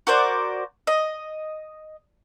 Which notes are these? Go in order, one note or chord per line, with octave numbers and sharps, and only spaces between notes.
F#4 A#4 C5 D5
D#5